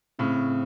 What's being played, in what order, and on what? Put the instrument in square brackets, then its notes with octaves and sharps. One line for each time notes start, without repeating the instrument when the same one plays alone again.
[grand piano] A2 C#3 [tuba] C4